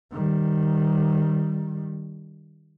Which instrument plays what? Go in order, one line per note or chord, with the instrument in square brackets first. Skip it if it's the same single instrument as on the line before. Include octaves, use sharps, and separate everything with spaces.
[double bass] D#3 G3